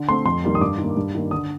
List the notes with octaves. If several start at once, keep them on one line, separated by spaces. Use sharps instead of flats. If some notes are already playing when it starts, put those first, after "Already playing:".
Already playing: D3
A3 C4 C6
F2 C6
D#3 G3 A#3
D#6
G2 D6
D#3 A#3
G2
D#3 A#3
D3 D#6